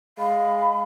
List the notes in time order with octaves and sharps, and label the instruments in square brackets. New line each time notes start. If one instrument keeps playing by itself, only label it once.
[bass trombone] G#3 [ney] F5 [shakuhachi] B5